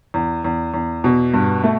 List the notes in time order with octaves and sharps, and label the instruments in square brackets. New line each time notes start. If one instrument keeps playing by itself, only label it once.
[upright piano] E2
E2
E2
B2
G2
A3